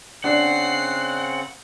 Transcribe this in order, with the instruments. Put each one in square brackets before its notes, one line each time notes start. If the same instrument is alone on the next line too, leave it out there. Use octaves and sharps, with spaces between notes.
[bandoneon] C#3 C4 [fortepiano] D4 [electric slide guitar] F#5 [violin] C7